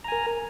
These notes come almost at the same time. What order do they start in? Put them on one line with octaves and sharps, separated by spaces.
A#5 G#5 A#4